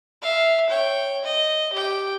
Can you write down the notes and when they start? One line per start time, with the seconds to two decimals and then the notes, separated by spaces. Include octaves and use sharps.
0.22 E5 F5
0.69 C#5 G5
1.24 D#5
1.73 G4 G5